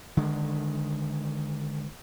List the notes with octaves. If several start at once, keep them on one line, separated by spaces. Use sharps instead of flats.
D3 D#3 G#3